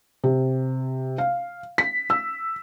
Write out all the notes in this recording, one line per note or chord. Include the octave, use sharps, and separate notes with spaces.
C3
F5
B6
E6